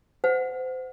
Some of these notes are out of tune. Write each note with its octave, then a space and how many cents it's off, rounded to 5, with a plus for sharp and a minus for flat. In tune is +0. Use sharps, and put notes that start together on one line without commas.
C5 -30 F#5 -5